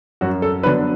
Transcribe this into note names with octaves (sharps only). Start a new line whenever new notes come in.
F#2 F#4
A4
D3 F#3 B3 D4 B4